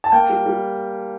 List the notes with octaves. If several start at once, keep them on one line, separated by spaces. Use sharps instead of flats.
A5
A#3 G5
G3
G3